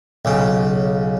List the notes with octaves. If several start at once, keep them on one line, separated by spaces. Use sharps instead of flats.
B1 C#3